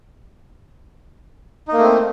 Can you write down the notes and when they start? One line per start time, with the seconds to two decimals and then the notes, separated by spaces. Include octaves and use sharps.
1.68 D#4
1.73 A#3
1.78 A3
1.83 C4